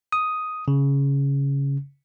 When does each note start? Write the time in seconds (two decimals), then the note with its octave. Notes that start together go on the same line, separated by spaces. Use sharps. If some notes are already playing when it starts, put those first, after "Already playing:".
0.12 D#6
0.68 C#3